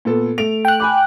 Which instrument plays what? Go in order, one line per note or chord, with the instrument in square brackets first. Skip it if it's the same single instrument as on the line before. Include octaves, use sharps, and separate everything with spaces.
[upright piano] A#2 B3 A4
A3 D7 F7
[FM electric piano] G5 F#6
[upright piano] G#5 B5 D6